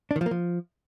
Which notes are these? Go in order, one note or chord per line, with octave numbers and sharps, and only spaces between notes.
D4
D#3
F3
A#3
F3